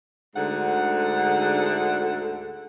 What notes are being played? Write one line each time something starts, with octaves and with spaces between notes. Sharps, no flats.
D2 G#2 D3 F#5